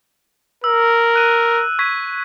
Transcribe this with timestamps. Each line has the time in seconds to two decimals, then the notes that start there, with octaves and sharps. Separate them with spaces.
0.64 A#4 E6
1.16 F#6 D#7
1.79 C#6 G#6 B6